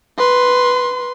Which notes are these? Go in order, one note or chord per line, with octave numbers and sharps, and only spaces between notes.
B4 C6